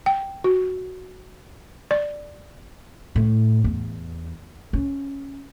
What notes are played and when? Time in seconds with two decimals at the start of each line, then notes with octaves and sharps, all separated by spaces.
0.06 G5
0.44 F#4
1.91 D5
3.16 A2
3.64 E2
4.73 C#4